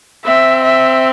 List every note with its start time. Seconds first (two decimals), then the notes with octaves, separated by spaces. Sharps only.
0.25 C4 E5
0.64 E5